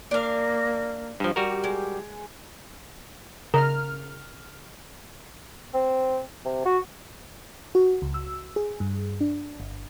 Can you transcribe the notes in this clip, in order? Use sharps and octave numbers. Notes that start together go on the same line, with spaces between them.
A#3 D4 F5
G2 F3
G3 F#4 G4 A#4
G#3
C#3 A#4 F6
C4
C3
F#4
F#4
C#2
E6
G#4
G2
D4
G1